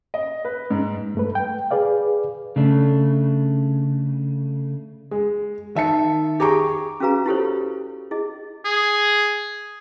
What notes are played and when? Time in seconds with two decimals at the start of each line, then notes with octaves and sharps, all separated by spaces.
0.14 D#5
0.45 B4
0.70 G#2
1.15 G2 A3 B4
1.35 G5
1.71 G#4 B4 D5 F5
2.56 C#3 A3 D4
5.11 G#3
5.75 D#3 E5 A5 C#7
6.40 G4 G#4 A#5 C#6 D6
7.00 C#4 F#4 G#4 B4 F5 A#5
7.26 E4 F4 G4 A4 C5 C#5
8.11 E4 G#4 D#5
8.65 G#4